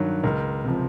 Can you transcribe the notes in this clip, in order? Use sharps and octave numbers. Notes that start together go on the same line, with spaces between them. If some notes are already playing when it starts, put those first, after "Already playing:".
Already playing: G2 D#3 F#3
C#2 A#4
C3 F3